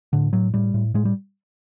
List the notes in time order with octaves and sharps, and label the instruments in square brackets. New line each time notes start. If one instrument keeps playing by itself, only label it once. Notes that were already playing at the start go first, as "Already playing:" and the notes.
[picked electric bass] A2 D3
A2 F#3
A2 G3
A2
A2 G#3
G3